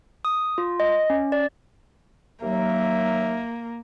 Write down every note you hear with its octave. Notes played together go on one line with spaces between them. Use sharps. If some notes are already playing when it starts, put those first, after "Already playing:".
D#6
F4
D#5
C#4
D5
D#2 F#3 A#3 E5